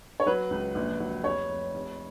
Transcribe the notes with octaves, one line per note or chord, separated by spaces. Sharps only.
C#5
F#3 B4
C#2
A#1
F#3
F1 C#5
F1
F1